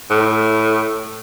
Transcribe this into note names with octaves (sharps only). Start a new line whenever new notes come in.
A2